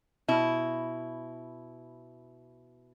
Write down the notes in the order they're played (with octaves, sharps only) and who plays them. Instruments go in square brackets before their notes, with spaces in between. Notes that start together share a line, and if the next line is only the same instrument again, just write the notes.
[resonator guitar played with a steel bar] B2 E4